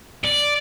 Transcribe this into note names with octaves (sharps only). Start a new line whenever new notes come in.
D5